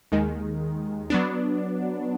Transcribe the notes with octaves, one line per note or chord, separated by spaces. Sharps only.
D#2 D#3 G#3
F#3 B3 D4